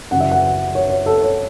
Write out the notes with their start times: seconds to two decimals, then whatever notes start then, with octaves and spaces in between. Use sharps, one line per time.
0.11 F#2 C#3 E3 F#5
0.20 E5
0.31 F#5
0.75 C#5
0.90 C#5
1.06 A4
1.22 C#5